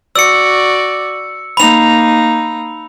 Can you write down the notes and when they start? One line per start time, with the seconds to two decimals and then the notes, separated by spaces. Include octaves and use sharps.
0.16 F#4 D5 E6 C#7
1.57 A#3 D#4 B5 F7